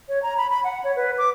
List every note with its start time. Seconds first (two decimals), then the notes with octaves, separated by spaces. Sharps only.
0.09 C#5
0.23 A#5
0.37 B5
0.50 B5
0.64 F#5
0.84 C#5
0.96 B4
1.18 D6